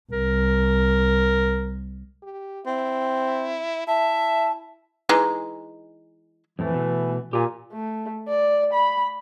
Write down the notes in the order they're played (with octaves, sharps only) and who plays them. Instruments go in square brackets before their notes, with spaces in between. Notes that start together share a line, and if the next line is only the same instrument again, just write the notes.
[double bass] C2 [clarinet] A#4
[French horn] G4
[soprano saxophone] C4 [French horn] E4
[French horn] E4 [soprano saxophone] E5 [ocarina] A5
[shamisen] E3 G#3 D#4
[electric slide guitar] F2 A2 A3 [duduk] E3
[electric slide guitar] B2 A3
[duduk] A#2 [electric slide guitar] G4 G#5
[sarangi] A3
D5
B5